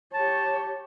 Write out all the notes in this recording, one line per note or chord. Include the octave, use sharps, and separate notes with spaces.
G4 C#5 A5